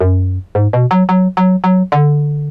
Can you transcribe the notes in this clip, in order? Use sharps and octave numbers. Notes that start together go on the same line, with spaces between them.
F#2
G#2
B2
F#3
F#3
F#3
F#3
D3